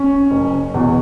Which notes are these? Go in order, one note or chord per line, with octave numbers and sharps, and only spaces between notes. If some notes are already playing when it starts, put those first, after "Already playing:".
Already playing: C#4
F#1
E2 B2